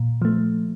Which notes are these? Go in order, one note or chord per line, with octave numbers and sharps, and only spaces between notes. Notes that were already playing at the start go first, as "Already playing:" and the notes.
Already playing: A#2
F3 A3